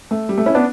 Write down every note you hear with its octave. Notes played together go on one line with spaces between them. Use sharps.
A3
G3
A3
C#4 E4
B3 D4